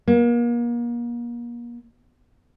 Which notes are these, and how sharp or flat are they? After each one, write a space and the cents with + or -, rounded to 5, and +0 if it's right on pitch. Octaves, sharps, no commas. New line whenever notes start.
A#3 +35